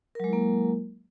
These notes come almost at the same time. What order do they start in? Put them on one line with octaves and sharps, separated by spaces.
A#4 F#3 G#3 E4 A#3